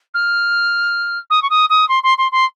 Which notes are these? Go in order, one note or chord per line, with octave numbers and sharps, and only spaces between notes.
F6
D#6
C#6
D#6
D#6
C6
C6
C6
C6